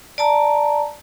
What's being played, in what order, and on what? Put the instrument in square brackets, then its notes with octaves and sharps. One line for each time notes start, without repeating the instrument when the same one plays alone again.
[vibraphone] D5 A5 A#5